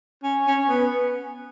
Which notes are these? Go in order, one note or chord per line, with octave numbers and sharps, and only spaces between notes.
C#4
C#4
B3